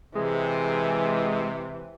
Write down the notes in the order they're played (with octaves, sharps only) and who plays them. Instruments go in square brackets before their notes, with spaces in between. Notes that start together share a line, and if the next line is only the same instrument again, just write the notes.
[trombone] C3 [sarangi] E3 [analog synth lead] G#3